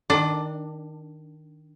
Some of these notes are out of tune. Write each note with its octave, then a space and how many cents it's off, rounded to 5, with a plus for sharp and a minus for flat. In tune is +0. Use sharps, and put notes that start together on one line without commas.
D#3 +0 D4 +0 D5 +40